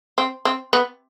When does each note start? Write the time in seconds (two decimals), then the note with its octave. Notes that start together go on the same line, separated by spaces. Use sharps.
0.18 C4
0.45 C4
0.73 B3